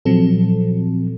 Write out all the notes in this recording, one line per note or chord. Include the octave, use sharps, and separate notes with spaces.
A#2 F3 F#3 C4 A4